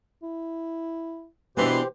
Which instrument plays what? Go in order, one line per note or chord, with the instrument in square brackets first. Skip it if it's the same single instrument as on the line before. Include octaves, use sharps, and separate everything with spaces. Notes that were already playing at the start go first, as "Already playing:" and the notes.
[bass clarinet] E4
[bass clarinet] B2 [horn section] E3 C6 [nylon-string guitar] B3 D4 [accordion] G4 C5